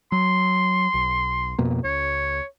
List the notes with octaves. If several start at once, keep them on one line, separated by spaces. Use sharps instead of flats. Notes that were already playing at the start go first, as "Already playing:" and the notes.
F#3 C6
B1
F2 B2 A#3
C#2 C#5